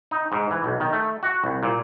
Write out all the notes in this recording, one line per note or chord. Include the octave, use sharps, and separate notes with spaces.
D#4
G#2
E3
B1
D#3
A3
F#4
C2
A#2